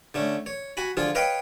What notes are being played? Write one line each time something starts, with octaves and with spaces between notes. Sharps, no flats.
D3 A3 C#4
C#5
F#4 G#5 B5
D3 F3 F4 G#4
B4 C#5 D#5 F5 G5